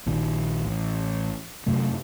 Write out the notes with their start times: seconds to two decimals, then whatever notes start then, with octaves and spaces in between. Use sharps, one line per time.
0.06 A#1 A#2 D#3
0.65 A1
1.66 F#2 C3 A3